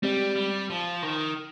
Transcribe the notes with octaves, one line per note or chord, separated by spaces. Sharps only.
G3 G#3 C4 G4 D5
G3
F3
D#3